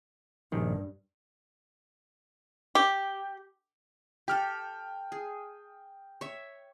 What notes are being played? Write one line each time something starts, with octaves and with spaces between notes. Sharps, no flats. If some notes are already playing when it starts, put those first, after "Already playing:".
A#1 G2 D#3
G4
G4 A4 G5 F6
G#4
C#5 E5